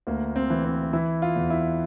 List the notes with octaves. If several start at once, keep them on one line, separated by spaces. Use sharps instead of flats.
D2 A#3
C4
E3
C4
E3 E4
F4
E2
E4